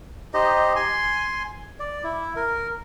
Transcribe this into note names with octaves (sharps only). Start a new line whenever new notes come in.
D#4 G4 C5 D#5
G#5 C6
D5
E4
A#4